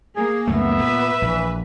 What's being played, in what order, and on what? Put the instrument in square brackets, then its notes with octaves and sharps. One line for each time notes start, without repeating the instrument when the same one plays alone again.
[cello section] A#3 [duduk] G#4
[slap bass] C#2 F#2 A3 [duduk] B3 [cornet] E5
[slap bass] A#2 [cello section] B4
[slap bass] A#1 [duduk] E3